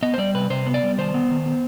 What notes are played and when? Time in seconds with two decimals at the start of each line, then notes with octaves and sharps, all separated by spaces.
0.03 B3 D#5
0.14 C5
0.18 G3 D5
0.34 C3 B4
0.50 C3 C5
0.66 B3
0.74 D5
0.83 G3
0.98 D#3 C5
1.14 B3
1.31 D#3
1.46 B3